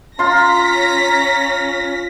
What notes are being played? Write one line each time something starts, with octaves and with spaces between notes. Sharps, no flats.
C#4 F4 A#5 C6 A#6 B6